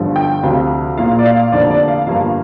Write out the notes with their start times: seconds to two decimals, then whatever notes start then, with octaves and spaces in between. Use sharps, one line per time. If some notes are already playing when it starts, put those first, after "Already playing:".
Already playing: G1 G2 D3 F3
0.16 G5
0.43 D2 C3 F3 C4 F5
0.98 A#1 A#2 A#3 F5
1.19 D5
1.25 F5
1.52 F1 F2 D3 A#3 D5
1.70 D5
1.88 F5
2.07 G1 G2 F3 A#3 F5